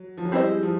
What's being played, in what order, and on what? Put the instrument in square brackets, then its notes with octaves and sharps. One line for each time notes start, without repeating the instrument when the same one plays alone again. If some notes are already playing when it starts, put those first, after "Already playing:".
Already playing: [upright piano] F#3
F3
F#3
[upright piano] G3 [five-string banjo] C4 E4 G#4 C5 D#5
[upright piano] G#3
F3